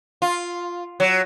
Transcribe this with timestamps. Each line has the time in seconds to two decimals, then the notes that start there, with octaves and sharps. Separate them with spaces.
0.22 F4
1.00 F#3